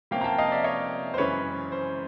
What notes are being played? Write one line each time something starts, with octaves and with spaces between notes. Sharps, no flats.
C3 F3 A#3 C#4 F5 G5
A#5
G5 A5
D#5 F5
D5 E5
C#5 D#5
C5
F#2 C#3 E3 G#3 C#4 B4 C#5
C5